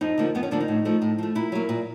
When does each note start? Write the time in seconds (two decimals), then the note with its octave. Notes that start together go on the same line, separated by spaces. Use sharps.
0.01 F2 D#4
0.18 D3 F3 A#3
0.35 F2 B3
0.43 C#4
0.51 D3 F3 A#3 D4
0.60 D#4
0.68 A2
0.85 F3 A3
1.02 A2
1.18 F3 A3
1.35 A#2 E4
1.52 F#3 A#3
1.69 A#2